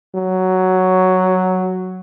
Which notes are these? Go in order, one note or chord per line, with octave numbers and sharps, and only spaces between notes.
F#3